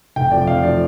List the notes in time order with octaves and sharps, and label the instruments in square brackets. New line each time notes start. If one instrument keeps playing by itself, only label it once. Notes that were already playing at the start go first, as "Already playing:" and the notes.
[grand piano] F1 G5
F2 F3 D5
F1 F5
F3 D5